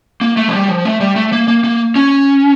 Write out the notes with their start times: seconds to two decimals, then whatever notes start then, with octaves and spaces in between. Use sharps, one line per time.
0.21 A#3
0.37 A3
0.48 F3
0.53 G3
0.68 F3
0.85 A3
1.01 G3
1.16 A3
1.32 A#3
1.48 A#3
1.64 A#3
1.96 C#4